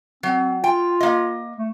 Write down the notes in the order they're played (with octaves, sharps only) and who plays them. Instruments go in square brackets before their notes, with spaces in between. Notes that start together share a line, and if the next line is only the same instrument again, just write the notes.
[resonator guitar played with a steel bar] F#3 [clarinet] C4
[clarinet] F4 [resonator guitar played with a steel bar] G5
[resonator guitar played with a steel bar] A#3 D#5
[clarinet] A3